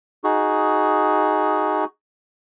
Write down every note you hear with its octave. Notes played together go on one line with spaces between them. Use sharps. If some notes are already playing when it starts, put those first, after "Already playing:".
D#4 F#4 G#4